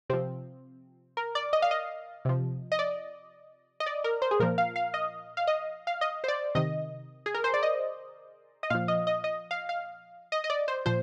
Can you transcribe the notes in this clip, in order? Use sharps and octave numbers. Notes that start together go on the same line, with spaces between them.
C3 F3 C4
A#4
D5
D#5
F5
D#5
C3 F3
D#5
D5
D#5
D5
A#4
C5
G#4
A#2 F3 A#4
F5
F5
D#5
F5
D#5
F5
D#5
C5
D5
C3 D#3 D#5
G#4
A#4
C5
D5
D#5
D#5
A#2 F3 F5
D#5
D#5
D#5
F5
F5
D#5
D#5
D5
C5
A#2 F3 C5